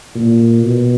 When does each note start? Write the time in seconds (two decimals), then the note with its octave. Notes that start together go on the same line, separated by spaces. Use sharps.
0.15 A#2
0.63 B2